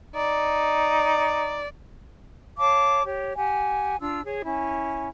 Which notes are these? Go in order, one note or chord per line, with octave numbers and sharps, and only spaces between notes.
D#4 D5
C#5 F5 A5 D6
G4 C#5
G4 F#5 G#5
D4 F4 E6
G#4 C#5
C#4 E4